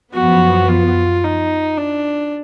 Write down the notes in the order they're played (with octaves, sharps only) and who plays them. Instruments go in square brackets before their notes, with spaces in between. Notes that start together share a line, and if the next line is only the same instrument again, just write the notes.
[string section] F#2 F3 B3 [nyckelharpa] F#4
[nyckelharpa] F4
D#4
D4